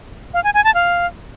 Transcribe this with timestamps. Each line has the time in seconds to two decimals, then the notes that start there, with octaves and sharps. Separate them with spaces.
0.34 F5
0.44 G#5
0.54 G#5
0.64 A5
0.74 F5